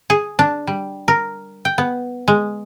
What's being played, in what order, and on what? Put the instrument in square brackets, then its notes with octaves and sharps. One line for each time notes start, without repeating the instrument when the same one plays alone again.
[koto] G#4
D4
G3
A#4
G5
B3
G#3